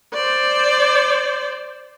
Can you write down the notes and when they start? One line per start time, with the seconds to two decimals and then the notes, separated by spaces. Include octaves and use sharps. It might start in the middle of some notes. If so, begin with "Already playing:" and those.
0.14 C5 D5